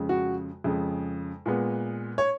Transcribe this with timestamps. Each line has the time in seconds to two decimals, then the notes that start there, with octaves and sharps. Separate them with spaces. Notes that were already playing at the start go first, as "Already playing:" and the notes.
Already playing: F2 C#3 G#3
0.09 F#4
0.64 F2 C#3 G#3
1.46 A#2 G#3 B3
2.18 C#5